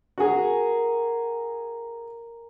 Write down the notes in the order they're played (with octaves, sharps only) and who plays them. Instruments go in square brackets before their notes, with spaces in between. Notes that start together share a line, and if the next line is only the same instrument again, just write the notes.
[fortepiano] F#4 G#4 [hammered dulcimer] A#4 G#5 A#5